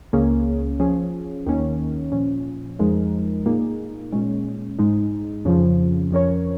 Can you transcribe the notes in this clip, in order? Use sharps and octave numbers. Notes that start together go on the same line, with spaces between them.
C#2 C#3 A#3 C#4 G#4
F3 C#4 G#4
D#2 D#3 A#3 C#4
A#2 F3 C#4
F2 F3 G#3 D#4 A#4
A#2 A#3 D#4 G#4
A#2 G#3 C#4
G#2 G#3 D#4
F2 C#3 F3
F2 F3 C#4 A#4 C#5